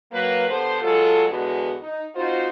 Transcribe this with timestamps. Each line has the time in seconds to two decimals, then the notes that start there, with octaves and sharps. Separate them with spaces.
0.13 F#3 A#3 B4
0.48 D3 B3 G4 A4 C5
0.82 F#3 G#3 F4 A4
1.29 E2 D3 G#3 B3 F#4
1.80 D#4
2.15 C4 D#4 F4 F#4 C5